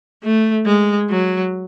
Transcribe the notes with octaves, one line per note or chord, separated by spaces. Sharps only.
A3
G#3
F#3